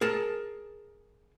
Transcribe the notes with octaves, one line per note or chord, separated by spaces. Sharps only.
G#4 A#4 A5